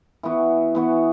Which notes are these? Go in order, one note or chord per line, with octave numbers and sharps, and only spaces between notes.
E3 B3 F#4
E3 B3 F#4